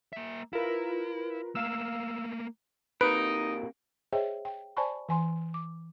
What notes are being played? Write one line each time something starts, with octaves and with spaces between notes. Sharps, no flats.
A#3 E5
E4 F4 A#4 B4
A3 A#3 F5 E6
C3 A#3 D#4 B4 D7
G#4 C5 C#5 D#5 E5 G5
G5
C5 D5 G#5 A5 B5 C#6
E3 G#5 C6
D6